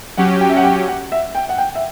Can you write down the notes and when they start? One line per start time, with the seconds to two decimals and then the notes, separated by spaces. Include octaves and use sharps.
0.18 F#3 C#4 G4 F#5
0.41 G5
0.50 E5
0.57 F#5
0.64 G5
0.88 F#5
1.12 E5
1.35 G5
1.49 F#5
1.58 G5
1.75 E5